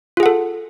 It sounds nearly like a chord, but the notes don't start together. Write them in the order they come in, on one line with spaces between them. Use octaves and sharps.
F4 G#4 F#5 A4